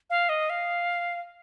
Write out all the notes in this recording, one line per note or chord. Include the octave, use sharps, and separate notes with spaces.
F5
D#5
F5